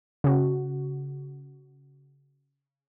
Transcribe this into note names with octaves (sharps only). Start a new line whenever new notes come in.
C#3 F#4